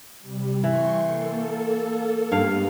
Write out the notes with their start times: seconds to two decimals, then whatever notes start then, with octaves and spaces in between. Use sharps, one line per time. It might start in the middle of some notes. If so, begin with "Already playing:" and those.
0.19 C3 G3
0.64 E3 G5 C6 C#6
1.05 A#3 A4
2.32 G2 G#3 B3 F5